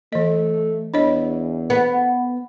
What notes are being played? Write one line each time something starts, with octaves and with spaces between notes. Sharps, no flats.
E3 A3 D#5
E2 D4 C#5 D#5
B3